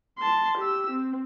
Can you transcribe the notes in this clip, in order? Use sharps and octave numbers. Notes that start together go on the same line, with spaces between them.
A5 C6
G4 E6
C4